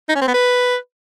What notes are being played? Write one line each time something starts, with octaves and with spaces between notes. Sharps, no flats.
D#4
C#4
C4
B3
B4